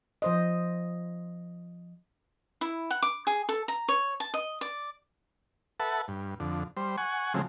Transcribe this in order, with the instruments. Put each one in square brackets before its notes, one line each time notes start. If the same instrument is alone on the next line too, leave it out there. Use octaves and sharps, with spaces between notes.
[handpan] F3 C5 D#5
[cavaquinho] E4
F#5
D6
G#4
A4
A#5
C#5
A5
D#5
D5
[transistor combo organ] A4 B4 E5 F#5 A5
G2
F2 D3
G3 C5
F#5 G#5 C#6
C#3 F3 F#3 G#3 A3 C4